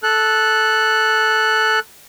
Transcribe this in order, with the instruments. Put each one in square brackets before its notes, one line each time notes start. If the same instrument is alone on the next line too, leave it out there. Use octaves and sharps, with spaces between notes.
[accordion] A4 F#6